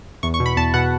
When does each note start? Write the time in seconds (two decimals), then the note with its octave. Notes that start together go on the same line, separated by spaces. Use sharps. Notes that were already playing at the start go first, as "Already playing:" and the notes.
0.23 E2 C#6
0.34 C#6
0.40 B2
0.46 B5
0.57 E2 A5
0.74 B2 F#5